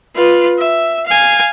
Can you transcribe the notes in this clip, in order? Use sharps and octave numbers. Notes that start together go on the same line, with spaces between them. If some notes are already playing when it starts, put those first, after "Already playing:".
F4 B4
E5
F5 G#5